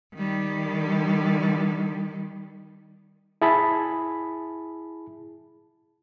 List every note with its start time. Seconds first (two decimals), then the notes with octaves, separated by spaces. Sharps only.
0.15 D#3 G3
3.42 E4 G#4 A5 B5